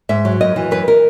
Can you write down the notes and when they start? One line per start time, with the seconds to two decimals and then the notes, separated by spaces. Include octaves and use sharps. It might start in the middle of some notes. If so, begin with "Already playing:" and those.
0.09 G#2 E5
0.25 F#3
0.41 F#2 D#5
0.56 E3
0.71 F#2 B4
0.88 A#4